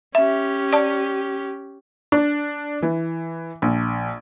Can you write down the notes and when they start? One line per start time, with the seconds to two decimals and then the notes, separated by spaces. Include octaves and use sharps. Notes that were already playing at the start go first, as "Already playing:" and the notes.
0.15 C#4 G4 E5
0.73 D5 A5
2.12 D4
2.82 E3
3.62 A#1